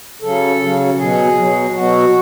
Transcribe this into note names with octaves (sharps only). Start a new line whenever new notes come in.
C#3 F#3 A4
C#3 F#3
B2 F#3 G#4
B2 F#3
B2 F#3 F#4